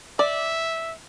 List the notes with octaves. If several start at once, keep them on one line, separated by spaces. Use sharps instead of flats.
D5 E5